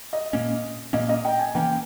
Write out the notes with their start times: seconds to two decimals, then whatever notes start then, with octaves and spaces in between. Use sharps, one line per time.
0.13 D#5
0.33 A#2 A#3 C#4
0.93 A#2 A#3 C#4 D#5
1.09 D#5
1.25 G5
1.39 G#5
1.55 E3 A#3 C#4 G5